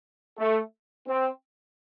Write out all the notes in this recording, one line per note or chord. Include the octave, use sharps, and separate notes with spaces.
A3
C4